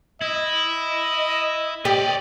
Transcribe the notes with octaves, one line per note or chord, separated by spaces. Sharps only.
E4 D#5
G4 D5 D#5